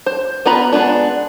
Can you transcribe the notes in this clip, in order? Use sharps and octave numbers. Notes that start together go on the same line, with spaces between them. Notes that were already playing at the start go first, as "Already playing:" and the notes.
C5
B3 F4 A#5 B5
G#3 B3 D4